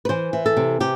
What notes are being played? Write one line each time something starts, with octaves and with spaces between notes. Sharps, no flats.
B4
E3 C5
E3
A4
C3
C3 G4